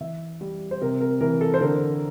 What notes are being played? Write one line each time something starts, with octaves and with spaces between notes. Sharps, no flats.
E3 E5
G3
C5
C3 A#4
A#4
E3 A#4
A4
C5
D3 A#4